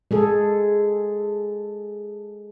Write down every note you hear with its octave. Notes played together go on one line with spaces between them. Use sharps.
G#3 G#4 A4